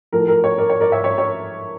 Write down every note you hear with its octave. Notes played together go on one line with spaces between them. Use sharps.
A2 F3 A3 A#4
A#4
C#5
A#4 D5
C#5
A#4 D5
C#5 E5
C#5
C#5